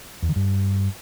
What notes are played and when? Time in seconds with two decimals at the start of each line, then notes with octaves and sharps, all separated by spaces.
0.22 E2
0.29 D#3
0.36 G2